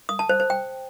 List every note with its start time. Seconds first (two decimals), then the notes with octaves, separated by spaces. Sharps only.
0.09 D#6
0.19 A5
0.29 C5
0.40 C5
0.50 G5